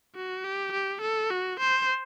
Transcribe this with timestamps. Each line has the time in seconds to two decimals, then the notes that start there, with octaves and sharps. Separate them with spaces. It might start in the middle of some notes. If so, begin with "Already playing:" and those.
0.15 F#4
0.44 G4
0.72 G4
1.02 A4
1.31 F#4
1.60 C5